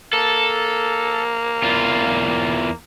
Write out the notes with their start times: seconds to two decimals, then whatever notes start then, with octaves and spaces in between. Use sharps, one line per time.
0.13 A#3 A4
1.63 E2 F4